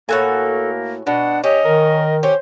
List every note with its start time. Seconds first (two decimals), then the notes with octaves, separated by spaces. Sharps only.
0.09 A2 A#3 F#4 A4 G#5
1.07 B2 D4 F#5
1.44 C#4 G4 D#5
1.65 D#3 A#4
2.23 C#4 G4 C5